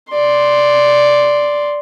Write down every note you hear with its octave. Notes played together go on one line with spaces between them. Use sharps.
D5 C6